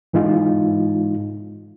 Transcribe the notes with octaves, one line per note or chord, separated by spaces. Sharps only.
G#2 E3 G#3 D#4 F4